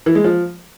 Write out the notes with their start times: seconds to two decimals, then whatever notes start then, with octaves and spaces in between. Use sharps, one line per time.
0.06 E3
0.15 G#3
0.24 F3